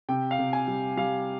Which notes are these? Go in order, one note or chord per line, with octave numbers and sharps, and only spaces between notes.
C3 G5
F5
C3
G#5
G3
G3 F5